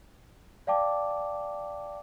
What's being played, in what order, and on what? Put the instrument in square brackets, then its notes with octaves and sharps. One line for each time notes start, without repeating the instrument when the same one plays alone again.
[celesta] D5 F5 G5 A5 D6